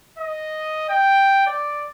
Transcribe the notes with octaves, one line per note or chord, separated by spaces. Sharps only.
D#5
G5
D5